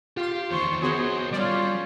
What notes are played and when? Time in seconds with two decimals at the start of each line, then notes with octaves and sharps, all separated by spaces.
0.17 F4 G4 C6
0.51 E2 D#3 C5 C#6
0.82 B3 F#4 G#4 A#4 C5 C#5
1.32 G3 C#4 F4 D5